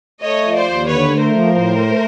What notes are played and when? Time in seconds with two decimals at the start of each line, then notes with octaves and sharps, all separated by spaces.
0.22 A3 C#5 D#5
0.44 F3
0.55 C5 D5
0.66 D#2
0.88 D3 B4 C#5
1.11 A3
1.22 A#4 C5
1.33 F3
1.55 A2
1.78 A3